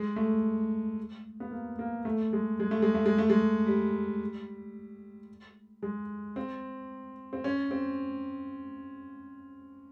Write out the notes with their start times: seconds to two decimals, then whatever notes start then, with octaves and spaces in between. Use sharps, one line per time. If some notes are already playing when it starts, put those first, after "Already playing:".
Already playing: G#3
0.16 A3
1.40 B3
1.51 A#3
1.79 A#3
2.05 A3
2.33 G#3
2.60 G#3
2.71 A3
2.82 G#3
2.94 A3
3.06 G#3
3.18 A3
3.30 G#3
3.66 G3
5.83 G#3
6.36 C4
7.33 C4
7.44 C#4
7.71 C4